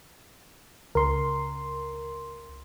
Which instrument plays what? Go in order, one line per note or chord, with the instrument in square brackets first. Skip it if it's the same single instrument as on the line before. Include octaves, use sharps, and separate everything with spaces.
[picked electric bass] C#2 [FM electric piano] A#4 C6